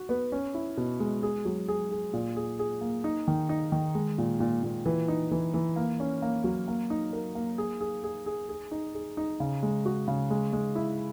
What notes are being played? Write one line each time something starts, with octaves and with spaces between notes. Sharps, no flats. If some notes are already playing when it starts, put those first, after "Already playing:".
Already playing: F#4
B3
C#4
E4
B2
G#3
G#4
F#3
G#4
G#4
A#2
G#4
G#4
A#3
D#4
D#3
D#4
D#3
G#3
A#2
A#2
A#2
E3
D#4
E3
E3
A#3
C#4
A#3
F#3
A#3
D#4
A#4
A#3
G#4
G#4
G#4
G#4
G#4
D#4
G#4
D#4
C#3
G#3
F#4
C#3
G#3
G#3
E4